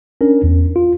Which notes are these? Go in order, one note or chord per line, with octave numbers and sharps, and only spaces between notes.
C#4 D4 A#4
E2
F4